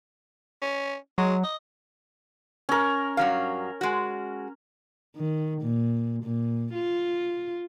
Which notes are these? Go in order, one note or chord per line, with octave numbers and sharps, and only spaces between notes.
C#4
F#3 G#3
D#5
C#4 A#4
G2 F#3 F5
G#3 F#4
D#3
A#2
A#2
F4